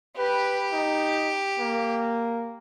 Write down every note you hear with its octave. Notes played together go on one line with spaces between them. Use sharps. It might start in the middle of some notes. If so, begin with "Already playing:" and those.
G4 B4
D#4
A#3